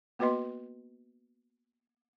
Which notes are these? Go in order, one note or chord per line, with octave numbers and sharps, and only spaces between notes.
A#3 B3 F#4 B4 D#5 C6